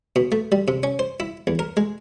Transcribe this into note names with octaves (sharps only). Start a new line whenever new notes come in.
B2
A3
G3
C3
C#4
C5
E4
E2
A#4
G#3